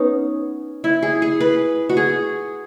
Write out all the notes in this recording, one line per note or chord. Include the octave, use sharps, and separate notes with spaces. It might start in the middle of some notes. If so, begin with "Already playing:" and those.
Already playing: B3 C#4 D#4
E4
G#4
G#4
B4
F#4
G#4